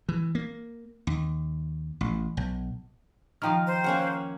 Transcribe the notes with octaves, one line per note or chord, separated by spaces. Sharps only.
E3
A#3
D#2
A1
B1
D#3 F3 F5 G5 A#5 F6
C5
A#3 C#4 F#5